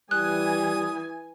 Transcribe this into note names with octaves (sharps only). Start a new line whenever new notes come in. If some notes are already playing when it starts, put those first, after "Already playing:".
E3 G3 G#5 D#6 F#6